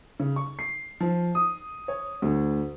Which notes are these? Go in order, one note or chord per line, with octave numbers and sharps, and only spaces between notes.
C#3
C#6
C7
F3
D#6
C#5
D2